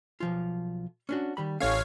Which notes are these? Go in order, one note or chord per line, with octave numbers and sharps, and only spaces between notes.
B1 F3 F4
C#4 D4 F#4
D#3 G3 B5
A1 C#4 A4 C#5 F5